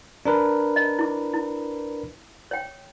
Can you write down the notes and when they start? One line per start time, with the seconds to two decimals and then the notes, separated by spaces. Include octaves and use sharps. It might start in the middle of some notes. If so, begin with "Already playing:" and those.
0.25 D4 A#4 B4
0.76 D#5
0.99 E4 D6
1.34 E4
2.51 C#5 G5